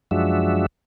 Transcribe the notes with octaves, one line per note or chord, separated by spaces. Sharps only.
F#2 F3 G#3 D4 F#4 E5